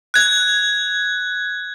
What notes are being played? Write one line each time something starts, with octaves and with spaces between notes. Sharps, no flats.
F#6 G#6